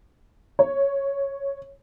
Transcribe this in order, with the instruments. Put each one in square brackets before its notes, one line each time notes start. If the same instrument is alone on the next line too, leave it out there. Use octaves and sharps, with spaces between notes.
[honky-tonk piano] C#5